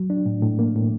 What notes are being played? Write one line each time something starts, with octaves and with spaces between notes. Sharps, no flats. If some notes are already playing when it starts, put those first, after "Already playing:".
Already playing: F#3
D4
A2
A2
A#3
A2